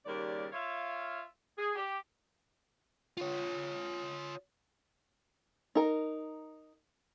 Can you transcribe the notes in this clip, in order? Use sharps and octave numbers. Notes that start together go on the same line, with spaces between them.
D#2 C#3 G3 A#4 C#5 D5
F4 C#5 E5 F5
G#4
G4
F4 C#5
D#4 A#4